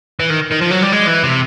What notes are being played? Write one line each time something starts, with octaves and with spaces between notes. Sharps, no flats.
E3
D#3
D#3
F3
F#3
G3
G#3
E3
C3